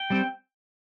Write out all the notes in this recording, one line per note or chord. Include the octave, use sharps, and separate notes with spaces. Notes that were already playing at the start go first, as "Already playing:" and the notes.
Already playing: G5
G3 C4